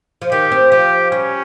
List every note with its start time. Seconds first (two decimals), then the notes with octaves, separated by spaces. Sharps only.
0.22 F3
0.32 D#3 G4
0.52 C4
0.72 F3 G4
1.11 G3 C#4